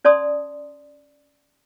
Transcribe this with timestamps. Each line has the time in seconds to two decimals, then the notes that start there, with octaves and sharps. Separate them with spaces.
0.05 C#4 D5 A5 C6 D#6